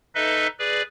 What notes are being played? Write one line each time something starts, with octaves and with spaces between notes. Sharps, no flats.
D#4 A4 B4 D#5 E5
G#4 B4 D5